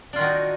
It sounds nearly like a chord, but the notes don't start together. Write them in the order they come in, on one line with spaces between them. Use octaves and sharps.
D4 F4 D#3 F#4 D#4